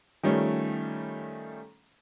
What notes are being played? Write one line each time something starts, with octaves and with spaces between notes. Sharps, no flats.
D#3 F3 G3 A3 C#4